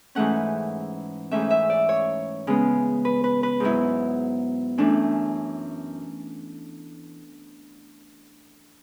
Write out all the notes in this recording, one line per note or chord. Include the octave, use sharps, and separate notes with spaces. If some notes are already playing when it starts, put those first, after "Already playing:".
G#2 E3 A3 C#4 F#5
G#2 E3 A3 C#4 E5
E5
D5
C#5
C#3 G#3 B3
B4
B4
B4
G#2 F#3 B3 E4
F#2 E3 A3 C#4 D4